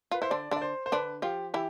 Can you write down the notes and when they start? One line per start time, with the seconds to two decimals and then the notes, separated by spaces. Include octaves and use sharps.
0.11 F4 B4
0.22 E4 C5
0.30 D3 D4 D5
0.51 D3 D4 D5
0.62 C5
0.86 C5
0.92 D3 D4 B4
1.22 F3 F4 G4
1.54 E3 E4 G4